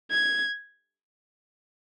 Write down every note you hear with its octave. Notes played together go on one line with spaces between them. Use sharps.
G#6